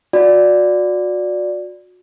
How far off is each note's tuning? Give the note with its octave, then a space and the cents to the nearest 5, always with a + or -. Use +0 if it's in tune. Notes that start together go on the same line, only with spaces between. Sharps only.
F#4 -30 D5 +0